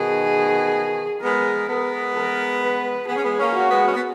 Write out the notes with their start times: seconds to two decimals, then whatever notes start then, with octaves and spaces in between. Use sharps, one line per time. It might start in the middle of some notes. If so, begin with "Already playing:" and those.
Already playing: B2 D#3 G#4
1.22 G#3 B3 A#4
1.69 G#3 B3 A#4
2.15 A#4
2.62 B4
3.08 B3 G#4
3.16 C#4
3.23 G#3 B3
3.39 A#3 C#4
3.55 F#4
3.70 G#3 B3
3.86 C#4
3.93 B3